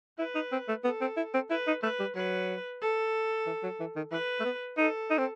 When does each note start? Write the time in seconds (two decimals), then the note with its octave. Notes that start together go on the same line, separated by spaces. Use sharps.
0.19 E4 B4
0.35 D#4
0.52 C4
0.69 A3
0.84 B3 A4
1.01 C4
1.17 E4
1.34 C4
1.50 E4 B4
1.67 D#4
1.83 A3 B4
2.00 G3
2.16 F#3 B4
2.82 A4
3.46 E3
3.63 F#3
3.80 E3
3.96 D#3
4.12 E3 B4
4.40 A3
4.45 B3
4.77 D#4 A4
5.11 D#4
5.18 C4